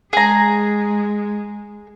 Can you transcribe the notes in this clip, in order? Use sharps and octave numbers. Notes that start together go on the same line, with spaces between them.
G#3 G#4 A#5